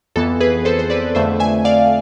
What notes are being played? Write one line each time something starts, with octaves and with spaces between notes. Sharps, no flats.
F2 E3 B3 A4
G#4 B4
A4 C5
C5
B4 D5
F2 D3 A3 C5 E5
E5 G#5
D5 F5